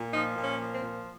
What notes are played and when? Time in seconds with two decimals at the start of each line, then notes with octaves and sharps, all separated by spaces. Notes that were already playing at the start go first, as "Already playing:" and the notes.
Already playing: A#2
0.13 F3 D#4
0.36 A#2
0.44 C#4
0.59 F3
0.75 C4
0.82 A#2